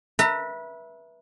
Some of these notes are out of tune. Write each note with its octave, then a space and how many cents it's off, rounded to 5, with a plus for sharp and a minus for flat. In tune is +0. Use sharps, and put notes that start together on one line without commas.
B4 -25 E5 +0 A#5 -40